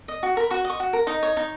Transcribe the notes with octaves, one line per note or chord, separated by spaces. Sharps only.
D#5
F#4
A#4 B5
F#4 C#6
D#5
C#6
F#4
A#4
D#4 D#5
C#5
D#4